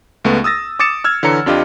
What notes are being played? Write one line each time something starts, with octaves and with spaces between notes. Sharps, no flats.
C#2 A3 B3
D#6 E6 A6 A#6
D6 D#6 A6 C#7 E7
E6 F6 G#6
D3 E3 C#5 A#5 C#7
F2 D4 F4 G4 D#5